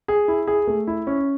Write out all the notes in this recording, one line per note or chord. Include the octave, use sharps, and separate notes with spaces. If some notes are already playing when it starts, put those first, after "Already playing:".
G#4
E4
G#4
A3
E4
C#4